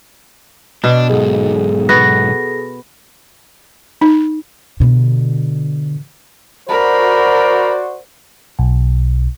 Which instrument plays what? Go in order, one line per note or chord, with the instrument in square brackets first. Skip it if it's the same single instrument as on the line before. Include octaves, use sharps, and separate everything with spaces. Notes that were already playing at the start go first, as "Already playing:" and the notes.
[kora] B2 [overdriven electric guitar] D4
[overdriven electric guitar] B1 G#2 [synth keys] G#4 A4
[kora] B3 F#4 [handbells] A#6
[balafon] D#4
[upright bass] B2 D3
[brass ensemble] F#4 C5 D5 [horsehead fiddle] A#4 [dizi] B5
[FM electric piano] B1